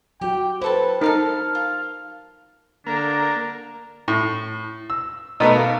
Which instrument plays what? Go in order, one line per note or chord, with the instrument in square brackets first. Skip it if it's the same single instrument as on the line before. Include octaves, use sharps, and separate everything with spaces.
[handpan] F#3 F#4 [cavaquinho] G4 [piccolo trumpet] G5
[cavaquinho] E4 A4 A5 [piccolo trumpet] B4 [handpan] C5
[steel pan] D#4 A#4 [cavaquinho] A4 F5 A5 [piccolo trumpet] F6
[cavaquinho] F4
[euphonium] D3 [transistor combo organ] A#3 [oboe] D4 [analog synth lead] A#5
[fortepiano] A2
E6
[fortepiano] B2 A3 B3 [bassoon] D#4
[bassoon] A#3